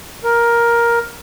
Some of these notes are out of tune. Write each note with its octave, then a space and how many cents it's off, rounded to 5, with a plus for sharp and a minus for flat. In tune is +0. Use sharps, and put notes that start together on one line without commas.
A#4 +10